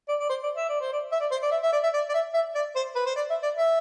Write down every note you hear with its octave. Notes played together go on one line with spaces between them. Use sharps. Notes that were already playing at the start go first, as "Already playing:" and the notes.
D5
D5
C5
D5
E5
D5
C5
D5
E5
D5
C5
D5
E5
E5
D5
E5
D5
D5
E5
E5
D5
C5
B4
C5
D5
E5
D5
E5